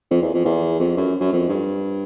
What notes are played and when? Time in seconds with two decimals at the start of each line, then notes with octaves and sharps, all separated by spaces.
0.11 F2
0.22 E2
0.34 F2
0.45 E2
0.80 F2
0.97 F#2
1.20 F#2
1.32 F2
1.49 G2